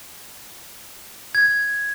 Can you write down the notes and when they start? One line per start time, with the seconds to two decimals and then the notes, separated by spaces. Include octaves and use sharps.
1.35 G#6